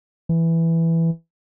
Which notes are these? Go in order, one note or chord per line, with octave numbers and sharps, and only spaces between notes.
E3